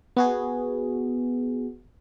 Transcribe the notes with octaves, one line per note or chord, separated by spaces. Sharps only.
B3 F#4 G#4